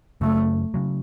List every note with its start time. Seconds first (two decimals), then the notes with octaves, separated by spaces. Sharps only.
0.21 F#2 C#3 F#3 A3
0.74 C#3 F#3